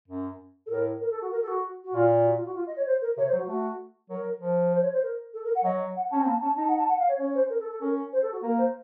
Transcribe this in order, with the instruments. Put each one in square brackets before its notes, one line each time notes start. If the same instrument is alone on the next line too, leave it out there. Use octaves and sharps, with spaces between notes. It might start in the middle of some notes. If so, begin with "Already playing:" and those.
[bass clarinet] F#2
[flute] A4
[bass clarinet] A2 [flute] A#4
[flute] A#4
A4
F#4
A#4
A4
F#4
F#4
[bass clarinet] A#2 [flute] F4
[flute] F#4
F4
F#4
F4
D#5
C#5
C5
A#4
[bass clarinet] C3 [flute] C#5
[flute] C5
[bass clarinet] F#3
[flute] F#4
[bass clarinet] A3 [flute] F#4
[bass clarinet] F#3 [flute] A#4
[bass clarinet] F3
[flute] C5
C#5
C5
A#4
A4
A#4
F#5
[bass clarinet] F#3 [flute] D#5
[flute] F#5
[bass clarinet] C#4 [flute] A5
[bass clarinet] C4
[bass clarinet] A#3 [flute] A5
[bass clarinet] C#4 [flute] A5
[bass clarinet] D#4 [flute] A5
[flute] F#5
A5
F#5
F5
C#5
[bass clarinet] C#4 [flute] C#5
[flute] C5
A#4
A4
A4
[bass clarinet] C#4 [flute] A#4
[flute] C5
A4
F#4
[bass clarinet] A#3 [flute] A#4
[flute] C5